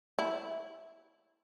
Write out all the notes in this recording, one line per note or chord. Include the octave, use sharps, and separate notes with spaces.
E4